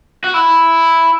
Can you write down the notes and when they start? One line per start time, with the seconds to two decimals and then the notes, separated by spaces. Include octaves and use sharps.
0.24 F#4
0.34 E4